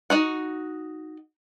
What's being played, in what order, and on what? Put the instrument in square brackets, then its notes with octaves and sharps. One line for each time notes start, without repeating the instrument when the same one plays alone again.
[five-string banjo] D#4 F#4 F#5